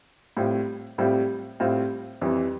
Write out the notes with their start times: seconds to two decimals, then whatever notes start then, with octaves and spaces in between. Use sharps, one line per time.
0.37 A2 G3 C4 F4
0.98 A2 G3 C4 F4
1.60 A2 G3 C4 F4
2.21 F2 E3 G3